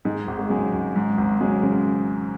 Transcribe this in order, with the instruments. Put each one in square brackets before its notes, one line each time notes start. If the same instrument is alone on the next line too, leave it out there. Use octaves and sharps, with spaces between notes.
[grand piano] G#2 [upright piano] D#3 G#3
[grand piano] G#1
[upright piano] G#3
[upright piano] C#3 F#3 [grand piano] G#3
[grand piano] G#1
G#2
G#1
[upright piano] C#3 F#3 [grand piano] G#3
[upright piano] C#3